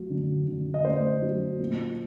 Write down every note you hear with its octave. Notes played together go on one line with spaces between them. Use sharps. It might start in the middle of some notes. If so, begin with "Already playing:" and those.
Already playing: F#3 A3
D3
D3
D#5
A3 C5 D5
F#3
A#2